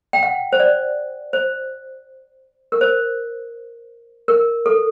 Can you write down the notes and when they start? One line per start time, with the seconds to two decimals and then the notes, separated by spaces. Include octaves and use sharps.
0.13 G5
0.23 F#5
0.53 C5
0.60 D5
1.33 C5
2.72 A#4
2.81 C5
4.28 A#4
4.66 A4